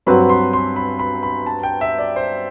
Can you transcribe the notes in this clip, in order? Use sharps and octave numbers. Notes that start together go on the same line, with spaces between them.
G2 F#3 C4 F#4 B4 B5
C6
C6
B5
B5
B5
A5
G5
E5
D5
C5